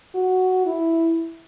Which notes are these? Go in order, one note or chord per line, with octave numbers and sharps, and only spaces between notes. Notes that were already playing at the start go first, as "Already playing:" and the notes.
F#4
E4